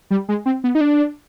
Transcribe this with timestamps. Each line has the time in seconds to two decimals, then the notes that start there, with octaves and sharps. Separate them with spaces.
0.11 G3
0.29 G#3
0.46 C4
0.64 B3
0.75 D#4
0.81 D4